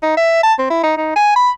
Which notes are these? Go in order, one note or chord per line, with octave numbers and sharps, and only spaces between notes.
D#4
E5
A5
C4
E4
D#4
D#4
G#5
B5